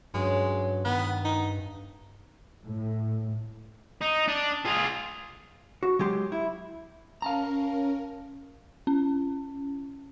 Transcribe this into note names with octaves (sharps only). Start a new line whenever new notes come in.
G2 F#3 G#3 C#4
D#3 B3 F#5
D#4
A2
D#4
D4
F4 G#4
F#4
F#3 G#3 G4 C6
E4
C#4 A#4 F5 A5 A#5
C#4